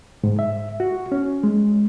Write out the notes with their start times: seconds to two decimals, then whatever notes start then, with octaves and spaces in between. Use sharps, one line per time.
0.24 G#2
0.39 E5
0.80 F#4
1.12 C#4
1.44 G#3